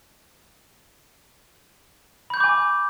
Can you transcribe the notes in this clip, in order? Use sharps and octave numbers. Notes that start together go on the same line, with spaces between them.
G#5 B5 C#6 D6 G6